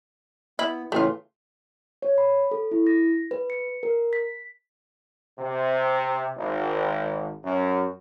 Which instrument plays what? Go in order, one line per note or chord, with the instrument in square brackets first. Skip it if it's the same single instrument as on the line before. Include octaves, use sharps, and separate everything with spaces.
[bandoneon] B3 [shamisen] E4
[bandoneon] A2 C#3 E3 [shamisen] A3 F4
[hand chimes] C#5
B5
A4
E4
A#6
B4
C#7
A#4
B6
[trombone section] C3
G#1
F#2